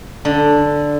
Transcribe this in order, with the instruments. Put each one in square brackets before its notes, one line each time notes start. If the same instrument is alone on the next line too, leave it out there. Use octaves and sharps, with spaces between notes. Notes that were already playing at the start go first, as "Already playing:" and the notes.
[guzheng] D3